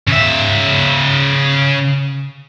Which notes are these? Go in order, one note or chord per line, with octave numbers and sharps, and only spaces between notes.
C#3 E5